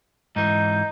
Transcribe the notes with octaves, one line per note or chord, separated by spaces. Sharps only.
G#2 E3 D#4 G6